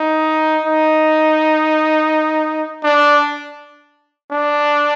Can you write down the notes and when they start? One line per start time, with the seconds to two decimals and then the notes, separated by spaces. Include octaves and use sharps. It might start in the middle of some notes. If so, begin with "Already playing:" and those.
Already playing: D#4
0.64 D#4
2.84 D4
4.31 D4